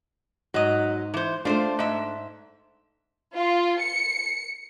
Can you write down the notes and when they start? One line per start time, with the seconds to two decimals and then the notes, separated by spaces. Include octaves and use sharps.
0.54 G#2 F#3 D#5
1.14 E3 C5
1.45 A3 D4 F4 C5
1.79 G#2 E5
3.35 F4
3.80 C#7